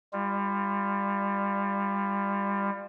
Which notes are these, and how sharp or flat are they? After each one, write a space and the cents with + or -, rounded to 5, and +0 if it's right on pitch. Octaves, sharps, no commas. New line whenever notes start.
G3 +25 F4 +0